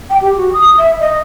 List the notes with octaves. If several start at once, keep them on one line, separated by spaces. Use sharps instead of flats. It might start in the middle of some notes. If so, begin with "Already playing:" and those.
G5
G4
F#4
D#6
E5
D#5